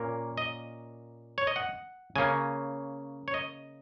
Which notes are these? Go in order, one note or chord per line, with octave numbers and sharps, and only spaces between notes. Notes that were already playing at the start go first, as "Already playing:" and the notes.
Already playing: A#2 A#3 C#4 A#4
D#5
C#5
D#5
F#5
C#3 A#3 C#4 G#5
C#5
D#5